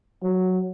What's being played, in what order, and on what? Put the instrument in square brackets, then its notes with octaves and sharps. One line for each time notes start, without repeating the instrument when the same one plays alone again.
[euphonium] F#3